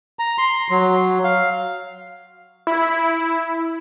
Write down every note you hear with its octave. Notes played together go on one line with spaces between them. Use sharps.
A#5
C6
F#3
F5
E4